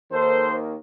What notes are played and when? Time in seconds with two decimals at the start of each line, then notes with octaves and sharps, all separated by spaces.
0.12 D#2 D#3 A#3 A4 C5